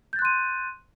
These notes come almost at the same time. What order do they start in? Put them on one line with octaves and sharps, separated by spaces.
G6 A6 F#6 C6 D#7